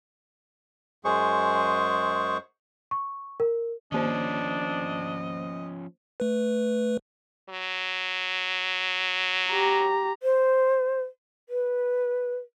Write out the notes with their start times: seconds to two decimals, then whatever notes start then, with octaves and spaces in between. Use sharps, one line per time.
1.05 F#2 G#3 G#4 C5 C#6
2.91 C#6
3.40 A#4
3.92 D#3 F3 A#3 C#4 D4 C5 D#5
6.20 A3 B4
7.49 F#3
9.50 G4 A#5
10.23 C5
11.49 B4